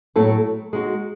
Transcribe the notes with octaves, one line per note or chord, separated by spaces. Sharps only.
A2 F#3 A3 E4 A4
G#3 D#4 F#4